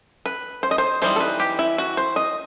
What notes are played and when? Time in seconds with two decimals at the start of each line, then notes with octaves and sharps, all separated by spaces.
0.26 B4
0.63 C5
0.71 D#5
0.78 C5
1.02 E3 G3 D#4 C5
1.16 A4
1.20 B4
1.40 G4
1.59 E4
1.78 F#4
1.97 C5
2.16 D#5